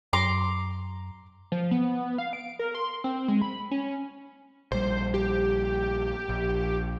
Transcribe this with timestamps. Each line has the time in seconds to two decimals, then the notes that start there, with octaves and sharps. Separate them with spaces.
0.13 F#2 A#5 C6 D6
1.52 F3
1.71 B3
2.18 F5
2.33 D7
2.59 A#4
2.75 C6
3.04 C4
3.28 G#3
3.41 B5
3.71 C#4
4.72 A#1 G3 C5
5.14 G4
6.29 A#1